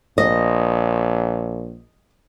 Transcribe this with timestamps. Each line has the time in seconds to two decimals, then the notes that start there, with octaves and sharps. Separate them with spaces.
0.18 A#1 D#5